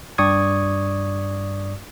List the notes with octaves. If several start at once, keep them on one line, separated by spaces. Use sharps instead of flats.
G2 D5 C#6 D#6 G#6